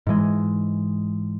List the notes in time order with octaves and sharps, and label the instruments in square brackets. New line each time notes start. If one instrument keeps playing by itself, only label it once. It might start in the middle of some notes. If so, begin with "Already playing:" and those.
[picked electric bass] G#2 E3 G#3